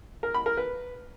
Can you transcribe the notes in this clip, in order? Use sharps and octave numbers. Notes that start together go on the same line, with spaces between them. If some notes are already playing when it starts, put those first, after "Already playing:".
A#4
B5
A#4
B4